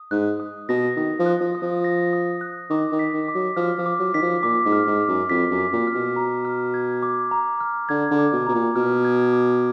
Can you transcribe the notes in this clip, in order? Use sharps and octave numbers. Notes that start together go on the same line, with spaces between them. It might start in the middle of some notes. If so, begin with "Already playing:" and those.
Already playing: D#6
G#2 F#6
D#6
B2 A#6
D#3 D#6
F3
F#6
F3
D#6
F3
A#6
D#6
F#6
D#3 D6
D#3
B6
D#3
D6
F#3
F3 F6
F3
D6
F#3
D#3 B6
F3
A#2 D6
G#2
F6
G#2
D6
F#2
F2 B6
F#2
D6
A#2
F6
B2
A#5
F6
G#6
D6
A#5
F6
D3 G#6
D3
D6
B2
B2 A#5
A#2
B2 F6
G#6
D6